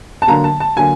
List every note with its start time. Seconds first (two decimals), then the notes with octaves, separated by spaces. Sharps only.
0.22 A5
0.27 D3 F#3 A#3 A#5
0.44 A5
0.60 A5
0.76 D3 F#3 A#3 G#5